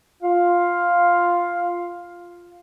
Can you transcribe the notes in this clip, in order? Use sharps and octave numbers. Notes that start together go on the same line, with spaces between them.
F4 F5